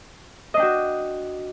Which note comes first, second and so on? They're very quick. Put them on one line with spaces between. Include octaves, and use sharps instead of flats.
D#5 D4 G5 F#4